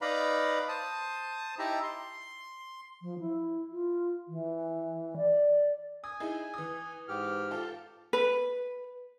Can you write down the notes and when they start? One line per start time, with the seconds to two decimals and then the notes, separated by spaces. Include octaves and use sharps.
0.01 D#4 B4 D5 F5 A#5 B5
0.69 C5 A5 D#6
1.59 D#4 E4 G4 E5 A5 A#5
1.83 C6
3.02 F3
3.19 E4
3.72 F4
4.28 E3
5.17 D5
6.04 G#5 D#6
6.20 D#4 E4 G#4
6.54 E3 D#6
7.08 G#2 G4 F6
7.51 F4 A4
8.13 B4